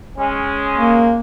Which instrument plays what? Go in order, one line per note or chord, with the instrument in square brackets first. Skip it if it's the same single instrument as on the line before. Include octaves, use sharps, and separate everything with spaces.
[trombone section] G#3 C#4
[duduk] A#3